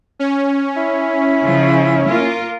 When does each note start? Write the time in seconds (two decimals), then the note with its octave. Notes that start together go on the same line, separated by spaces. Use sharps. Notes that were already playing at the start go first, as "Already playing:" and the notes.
0.19 C#4
0.77 E4
1.44 C#3 F3
2.07 A#3 F4 A#4